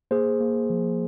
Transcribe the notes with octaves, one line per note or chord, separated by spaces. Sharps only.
A#3 G#4 C5
A#3
F3